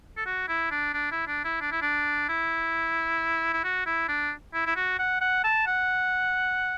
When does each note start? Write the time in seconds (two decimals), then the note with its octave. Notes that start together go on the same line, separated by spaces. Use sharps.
0.17 A4
0.26 F#4
0.48 E4
0.71 D4
0.94 D4
1.11 E4
1.27 D4
1.44 E4
1.61 D4
1.71 E4
1.82 D4
2.29 E4
3.53 E4
3.64 F#4
3.86 E4
4.08 D4
4.53 E4
4.66 E4
4.76 F#4
4.99 F#5
5.21 F#5
5.44 A5
5.67 F#5